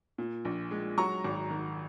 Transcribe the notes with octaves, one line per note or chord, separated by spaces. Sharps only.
A#2
A#1
G#3
F#3 A#5 C#6
G#1
D#3